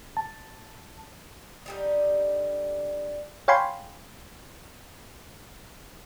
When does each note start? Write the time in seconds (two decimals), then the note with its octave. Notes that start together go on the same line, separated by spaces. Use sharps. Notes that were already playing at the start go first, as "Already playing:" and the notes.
0.17 A5
1.66 D3 G3 D#4
3.48 C#5 F5 G5 G#5 B5 C6